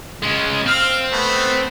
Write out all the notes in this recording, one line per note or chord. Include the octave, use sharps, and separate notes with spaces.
G#3 C#4
C4 F5 F6
A3 B3